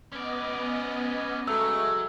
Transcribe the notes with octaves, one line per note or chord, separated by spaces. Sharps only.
B3 C#4 D5 D#5
C#3 F#3 G#3 A3 E6